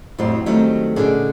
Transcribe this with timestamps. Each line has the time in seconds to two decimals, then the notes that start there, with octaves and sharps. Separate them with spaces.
0.18 F2 A2 F#3 G3 C5
0.46 D#3 F#3 G3 A3 C4 D#4
0.96 A#2 D3 C#4 D#4 G#4